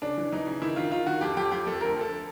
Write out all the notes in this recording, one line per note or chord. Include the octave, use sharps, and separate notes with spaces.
C#3 D4
E3
E3 D#4
C#3
D#3 E4
D#3 F4
D#3 F4
D#3 F#4
F2 G4
F2 G4
F2 G4
F2 A4
D2 A#4
D2 A4